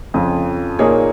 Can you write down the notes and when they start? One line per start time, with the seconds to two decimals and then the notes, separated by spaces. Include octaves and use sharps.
0.14 F2 C#3 F3
0.79 A#2 A#3 D#4 G#4 C#5